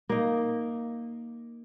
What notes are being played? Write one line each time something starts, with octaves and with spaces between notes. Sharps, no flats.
A#3 D#4